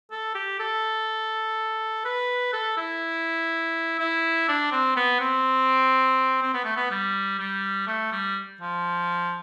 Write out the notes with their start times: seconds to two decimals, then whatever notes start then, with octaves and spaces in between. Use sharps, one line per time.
0.11 A4
0.35 G4
0.60 A4
2.05 B4
2.53 A4
2.77 E4
3.99 E4
4.48 D4
4.71 C4
4.96 B3
5.20 C4
6.42 C4
6.54 B3
6.64 A3
6.76 B3
6.91 G3
7.39 G3
7.87 A3
8.12 G3
8.61 F3